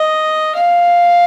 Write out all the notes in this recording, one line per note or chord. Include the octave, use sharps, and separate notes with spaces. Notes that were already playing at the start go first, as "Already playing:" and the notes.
Already playing: D#5
F5